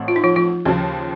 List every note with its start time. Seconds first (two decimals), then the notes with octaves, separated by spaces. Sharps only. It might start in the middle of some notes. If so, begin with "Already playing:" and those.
Already playing: A1 A2 A3 C4
0.08 F4
0.16 D#4
0.24 F3 F4
0.36 F3 F4
0.65 D#2 C#3 F3 C#4